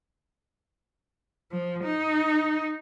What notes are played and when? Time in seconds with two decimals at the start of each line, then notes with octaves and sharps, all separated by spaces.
1.52 F3
1.84 D#4